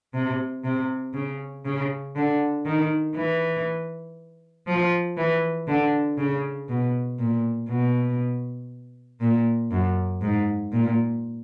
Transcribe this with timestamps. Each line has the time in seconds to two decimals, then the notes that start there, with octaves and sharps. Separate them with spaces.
0.14 C3
0.64 C3
1.14 C#3
1.65 C#3
2.16 D3
2.65 D#3
3.16 E3
4.67 F3
5.17 E3
5.68 D3
6.18 C#3
6.69 B2
7.19 A#2
7.69 B2
9.20 A#2
9.71 F#2
10.21 G#2
10.72 A#2